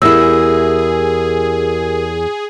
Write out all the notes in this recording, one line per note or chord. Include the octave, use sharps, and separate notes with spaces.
E2 E4 G4 G#4 A#4 E6